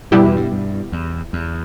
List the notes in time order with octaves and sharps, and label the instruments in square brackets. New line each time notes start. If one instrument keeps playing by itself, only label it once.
[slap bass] G2 [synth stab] B2 G3 B3 E4 G4
[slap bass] E2
G2
G2
E2
E2